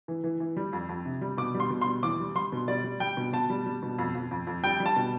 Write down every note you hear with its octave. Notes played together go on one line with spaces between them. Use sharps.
E3
E3
E3
G3
F2
F2
C3
G3
B2 D6
G3
C6
B2
C6
G3
E2 D6
G3
G3 C6
B2
G3 D5
G3
G3 G5
B2
B2 A5
G3
G3
B2
F2
F2
F2
F2
G3 G5
G3
A5
B2